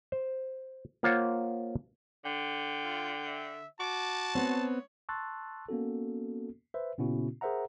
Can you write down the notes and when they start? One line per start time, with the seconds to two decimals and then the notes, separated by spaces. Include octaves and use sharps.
0.12 C5
1.03 A#3 F4 C5 C#5 F5 F#5
2.25 D3 G5
2.84 F4
3.26 E5
3.80 F#4 A5 D6
4.35 B3 C4 C#5
5.09 A5 C6 C#6 E6 F#6 A6
5.69 A#3 B3 C#4 F#4 A4
6.74 B4 C5 E5
6.98 A#2 C#3 B3 C#4 E4 F#4
7.41 G#4 A#4 C5 E5 F#5 A#5